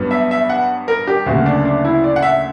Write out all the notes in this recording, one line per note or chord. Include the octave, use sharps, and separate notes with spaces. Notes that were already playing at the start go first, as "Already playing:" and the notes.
Already playing: G2 F#3 B3
E5
E5
F#5
A#4
G4
D2 C#3 F#3 A#3 F#4
D4
D4
E4
D5
F#5
E5